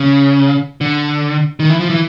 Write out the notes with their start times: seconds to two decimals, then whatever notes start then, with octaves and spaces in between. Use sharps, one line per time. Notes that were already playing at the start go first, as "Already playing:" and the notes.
Already playing: C#3
0.81 D3
1.60 D#3
1.70 E3
1.80 F3
1.90 E3